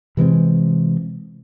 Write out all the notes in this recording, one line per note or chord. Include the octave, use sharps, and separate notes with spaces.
C3 E3 G#3 C4